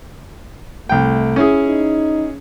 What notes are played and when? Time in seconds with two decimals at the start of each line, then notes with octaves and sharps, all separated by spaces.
0.89 C2 A3 G5
1.36 C#4 E4 G#4
1.67 D#4